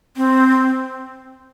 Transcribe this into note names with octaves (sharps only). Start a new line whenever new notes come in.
C4